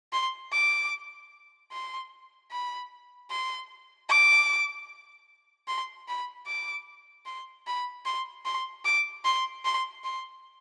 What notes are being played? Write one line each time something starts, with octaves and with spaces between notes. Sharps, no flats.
C6
D6
C6
B5
C6
D6
C6
B5
D6
C6
B5
C6
C6
D6
C6
C6
C6